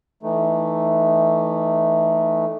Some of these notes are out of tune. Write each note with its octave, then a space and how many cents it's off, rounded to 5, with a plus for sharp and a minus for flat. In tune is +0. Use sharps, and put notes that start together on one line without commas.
E3 +0 A3 +0 D#4 -20